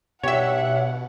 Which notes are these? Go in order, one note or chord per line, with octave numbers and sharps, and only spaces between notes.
G2 B2 D#4 G4 C#5 E5 F#5